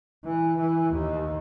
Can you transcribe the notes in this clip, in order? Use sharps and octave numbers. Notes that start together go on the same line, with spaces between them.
E3
E3
D#2